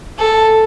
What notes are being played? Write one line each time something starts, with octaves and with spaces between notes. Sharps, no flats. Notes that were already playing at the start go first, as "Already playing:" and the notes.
A4